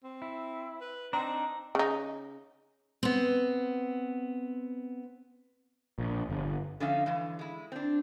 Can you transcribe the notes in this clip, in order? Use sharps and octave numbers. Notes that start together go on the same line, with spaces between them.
C4
E4
B4
C4 D4 D#4 A#5
C#3 D#4
B3 C4
A#1
G1
D3 F3 C#4 D#4 E5 F5
G2 D3 E3
G#3 E4
C4 D4